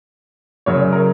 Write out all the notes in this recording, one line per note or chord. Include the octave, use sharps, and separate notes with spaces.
F#2 C#3 F#3 C#5
A#4